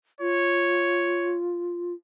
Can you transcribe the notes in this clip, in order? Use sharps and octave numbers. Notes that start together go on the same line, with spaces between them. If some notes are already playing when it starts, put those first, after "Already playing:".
F4 C#5